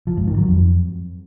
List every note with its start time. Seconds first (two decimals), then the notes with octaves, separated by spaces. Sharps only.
0.07 F3
0.17 G#2
0.27 D#3
0.38 F#3
0.48 F2